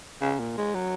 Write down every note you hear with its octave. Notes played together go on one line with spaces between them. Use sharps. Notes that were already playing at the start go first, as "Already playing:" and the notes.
C#3
A#2
G#3
F#3